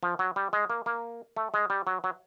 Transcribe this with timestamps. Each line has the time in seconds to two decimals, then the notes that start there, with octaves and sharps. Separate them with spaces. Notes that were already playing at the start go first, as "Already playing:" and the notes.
0.03 F3
0.19 F#3
0.36 G3
0.53 G#3
0.70 A#3
0.86 A#3
1.36 A3
1.54 G#3
1.70 G3
1.87 F#3
2.04 F#3